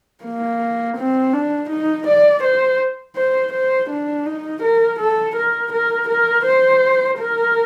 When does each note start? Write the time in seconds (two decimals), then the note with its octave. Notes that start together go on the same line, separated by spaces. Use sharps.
0.24 A#3
0.97 C4
1.33 D4
1.70 D#4
2.07 D5
2.43 C5
3.16 C5
3.53 C5
3.90 D4
4.26 D#4
4.63 A#4
4.99 A4
5.36 A#4
5.73 A#4
6.09 A#4
6.45 C5
7.19 A#4